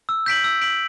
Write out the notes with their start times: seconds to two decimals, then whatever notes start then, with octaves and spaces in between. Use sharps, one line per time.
0.09 E6
0.26 G6 B6 D7 F#7
0.44 E6
0.61 G6 B6 D7 F#7